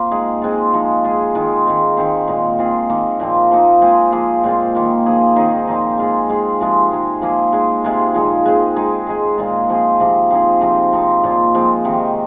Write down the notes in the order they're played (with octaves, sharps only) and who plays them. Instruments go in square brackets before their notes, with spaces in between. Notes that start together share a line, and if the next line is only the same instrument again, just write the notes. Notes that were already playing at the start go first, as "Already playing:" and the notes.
Already playing: [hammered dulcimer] A#3 C4 F4
G#3 D#4 G#4
G#3 C4 F4
F3 G#3 D#4
G#3 F4 G#4
D#3 G#3 F4
D#3 G#3 C4
D#3 C4 G#4
A#2 G#3 D#4
D#3 C4 F4 G#4
D#3 A#3 D#4
A#2 F3 C4
F3 A#3 D#4
G#3 C4 G#4
F3 A#3 F4 G#4
A#2 G#3 C4 F4
D#3 A#3 F4
F3 A#3 D#4 G#4
D#3 C4 D#4 G#4
A#2 F3 C4 D#4
G#3 F4 G#4
G#3 F4 G#4
C3 F3 G#3 F4
G#3 D#4 G#4
F3 A#3 G#4
G#3 D#4 G#4
C3 G#3 F4 G#4
A#2 F3 G#3 D#4
G#3 C4 G#4
G#3 D#4 G#4
G#3 D#4 G#4
A#2 G#3 C4 F4
F3 C4 G#4
C3 F3 A#3
F3 C4 D#4 G#4
C3 F3 C4 D#4
F3 C4 D#4
A#2 F3 A#3 F4
F3 G#3 C4
C3 D#3 C4